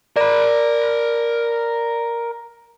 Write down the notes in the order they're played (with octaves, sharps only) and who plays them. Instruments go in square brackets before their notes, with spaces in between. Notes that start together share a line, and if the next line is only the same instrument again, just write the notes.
[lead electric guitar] A#4 B5 [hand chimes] D5